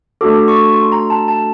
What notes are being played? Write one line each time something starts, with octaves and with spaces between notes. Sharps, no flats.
A3 D4 F#4 A4 D6
C#6
C6
A#5
A5
A5